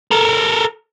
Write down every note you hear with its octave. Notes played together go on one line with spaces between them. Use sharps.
A4 A#4